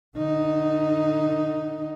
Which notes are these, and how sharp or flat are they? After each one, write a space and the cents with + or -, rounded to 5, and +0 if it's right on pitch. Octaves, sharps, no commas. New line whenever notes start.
D3 +35 D#4 +0